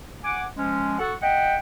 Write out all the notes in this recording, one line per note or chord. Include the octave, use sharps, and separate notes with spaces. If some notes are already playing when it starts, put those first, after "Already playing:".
F#5 G#5 D6
F3 G#3 C#4
F#4 A4 F#5
D#5 E5 F#5 G5